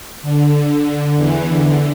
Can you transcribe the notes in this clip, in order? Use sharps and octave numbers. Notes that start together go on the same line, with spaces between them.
D3
E2 E3
D3